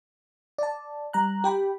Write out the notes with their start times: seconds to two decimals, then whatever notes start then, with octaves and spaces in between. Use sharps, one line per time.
0.58 D5 A5
1.13 G3 A#5 F#6
1.44 G4 G5 B5